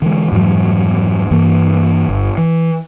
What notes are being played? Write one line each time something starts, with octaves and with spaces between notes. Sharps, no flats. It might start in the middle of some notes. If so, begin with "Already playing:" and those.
D3 E3 G#3
F2 G#2 E3 F#3
G2 E3 A#3
G1
E3